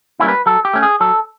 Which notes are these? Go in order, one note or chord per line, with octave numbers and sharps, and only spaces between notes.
G3 A#3 C#4 E4
B4
F#3 A4
G4
A3 C#4
G#4
F#3 A4